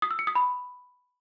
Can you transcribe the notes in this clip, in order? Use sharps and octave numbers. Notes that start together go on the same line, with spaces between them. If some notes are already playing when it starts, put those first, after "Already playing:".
D#6
E6
C#7
D#6
B5